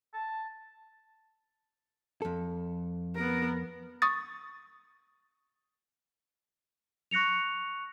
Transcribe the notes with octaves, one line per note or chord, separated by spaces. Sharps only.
A5
F2 A4
B3 A#4
C#6 D#6 A6
C#6 F#6 A#6 C#7 F7